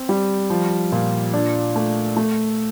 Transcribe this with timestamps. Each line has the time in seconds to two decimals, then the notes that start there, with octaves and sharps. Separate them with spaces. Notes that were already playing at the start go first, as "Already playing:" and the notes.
Already playing: C4
0.09 G3
0.50 F3
0.92 A#2
1.34 D4
1.76 A3
2.17 A3